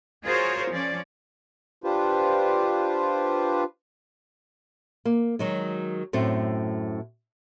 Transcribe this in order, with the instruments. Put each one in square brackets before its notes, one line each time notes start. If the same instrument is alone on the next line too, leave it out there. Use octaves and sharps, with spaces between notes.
[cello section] F4 F#4 G#4 A#4 C5 C#5
F3 C#4 D5
[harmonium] D4 F4 G4 B4 C5
[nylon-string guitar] A#3
D#3 F#3 G#3
F#2 A2 A3 C4